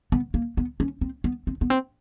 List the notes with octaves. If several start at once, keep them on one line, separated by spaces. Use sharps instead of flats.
B3
A#3
B3
C#4
C4
B3
C4
B3
C4